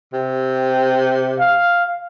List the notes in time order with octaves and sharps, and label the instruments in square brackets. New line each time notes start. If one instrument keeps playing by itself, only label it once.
[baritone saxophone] C3
[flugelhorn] F5